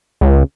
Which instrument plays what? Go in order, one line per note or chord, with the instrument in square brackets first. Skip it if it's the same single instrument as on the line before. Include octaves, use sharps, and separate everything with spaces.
[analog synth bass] C#2